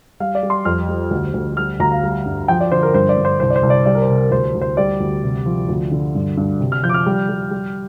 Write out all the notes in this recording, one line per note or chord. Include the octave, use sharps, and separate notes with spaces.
G3 F5
D5
G3
C6
F2 F6
G3
D2
D2
G3 F6
D2 A#5
F5
G3
G2
F3 G5
D5
D3 C5
A#4
G2 C5
D5
G2
C5
C2 C5
D5
C5
C2
D5
G3 D5
A#4
C5
C3
A#4
D2 C5
D2
C5
G3 D5
D2
C3
F3
D2
D3
G2
G2
C3
F6
F3 G6
D6
F6
G3
G3
G3